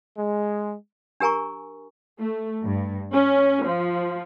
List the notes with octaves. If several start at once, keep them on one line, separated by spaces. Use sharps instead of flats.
G#3
D4 G4 A#4 G#5 A#5 C#6
A3
G2
C#4
F3